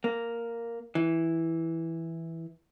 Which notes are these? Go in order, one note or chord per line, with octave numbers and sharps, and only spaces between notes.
A#3
E3